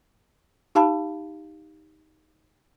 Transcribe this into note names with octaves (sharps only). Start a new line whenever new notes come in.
D#4 G4 F5 A5 B5